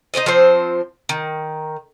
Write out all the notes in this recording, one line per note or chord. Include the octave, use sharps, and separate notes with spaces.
D#4 G4 C5 D#5
F3 C4 C5
D#3